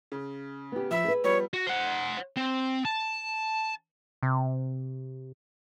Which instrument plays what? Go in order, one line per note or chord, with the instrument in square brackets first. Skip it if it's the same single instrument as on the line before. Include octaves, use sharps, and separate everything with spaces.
[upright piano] C#3
[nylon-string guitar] B3 G4
[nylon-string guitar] F3 [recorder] E5 [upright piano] B5 E6
[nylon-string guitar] G#4 B4
[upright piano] F3 G3 B3 [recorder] C#5
[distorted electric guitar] F#4
C5 F#5
C4
A5
[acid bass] C3